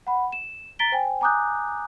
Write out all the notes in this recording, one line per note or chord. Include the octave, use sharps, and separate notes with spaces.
F#5 B5
E7
A#5 A6 B6 D7 G7
C5 G5 G#5
G#5 A#5 D6 D#6 F#6 G6